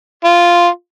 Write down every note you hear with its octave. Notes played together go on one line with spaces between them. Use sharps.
F4